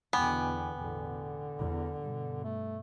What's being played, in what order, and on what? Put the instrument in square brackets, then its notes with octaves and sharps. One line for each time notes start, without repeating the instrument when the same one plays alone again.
[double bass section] E2 D3 [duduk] B2 [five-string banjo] B3 [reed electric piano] G5 G#5 D6
[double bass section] A1 E2 B2 [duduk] D3
[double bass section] E2
G2 B2
[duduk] A3